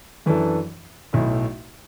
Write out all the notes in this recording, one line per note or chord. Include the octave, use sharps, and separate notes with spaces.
F#2 E3 D4 A4
B1 A2 A3 E4